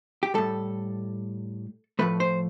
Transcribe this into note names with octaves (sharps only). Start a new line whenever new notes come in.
G4
A2 G3 A4
A2 F3 A3 B4
C5